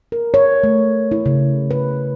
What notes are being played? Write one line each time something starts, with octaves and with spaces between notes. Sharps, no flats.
A#4
C#5
A3
E4
C#3
B4